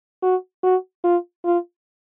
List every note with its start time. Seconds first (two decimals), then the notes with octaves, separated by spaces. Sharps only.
0.22 F#4
0.63 F#4
1.04 F4
1.45 F4